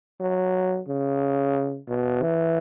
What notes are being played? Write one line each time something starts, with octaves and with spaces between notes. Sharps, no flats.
F#3
C#3
B2
E3